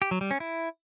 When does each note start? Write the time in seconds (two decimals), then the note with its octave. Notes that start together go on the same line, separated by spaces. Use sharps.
0.02 G4
0.11 F#3
0.21 G3
0.31 C#4
0.40 E4